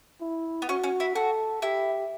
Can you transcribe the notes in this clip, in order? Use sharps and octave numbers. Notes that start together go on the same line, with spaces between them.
E4
B3
C#4 F#4
C#4
E4
F#4 A4
E4 G4